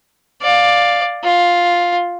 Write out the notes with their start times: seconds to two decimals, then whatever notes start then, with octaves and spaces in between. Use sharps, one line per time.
0.42 D5 F5
1.23 F4